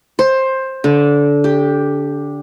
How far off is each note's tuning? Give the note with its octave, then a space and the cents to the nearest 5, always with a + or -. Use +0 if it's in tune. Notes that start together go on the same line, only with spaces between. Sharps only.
C5 +15
D3 -20
G4 +5